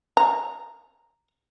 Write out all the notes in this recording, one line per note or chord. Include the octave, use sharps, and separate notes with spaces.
A#5